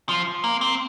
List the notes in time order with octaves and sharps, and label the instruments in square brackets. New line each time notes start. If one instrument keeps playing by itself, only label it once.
[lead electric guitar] F3
A#3
C4